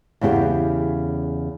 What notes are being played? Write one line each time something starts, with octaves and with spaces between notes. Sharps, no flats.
E2 C#3 B3 G4